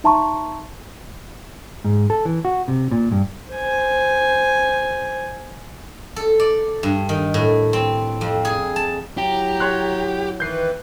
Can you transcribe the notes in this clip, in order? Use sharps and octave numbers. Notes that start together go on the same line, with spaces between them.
D#4 E5 A5 A#5 C6 C#6
G#2
A4
E3
F#4
C3
A#2
G2
C5 G#5
A4
D5
G2
D#3
A2
C4
F2
G#4
A5
F#3 E4 G4 A#5
C#5 C6 F#6
D#3 E3 B4 G6 C7